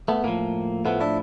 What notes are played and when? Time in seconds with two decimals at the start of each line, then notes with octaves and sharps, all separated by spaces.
0.08 A3 B3
0.24 A2 F3 A#3
0.85 A2 F3 A3 B3
1.01 D4 E4